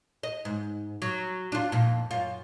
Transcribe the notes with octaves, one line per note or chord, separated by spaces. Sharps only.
D#5
G#2
F#3
D4 F4
F2 A#2
F#2 F4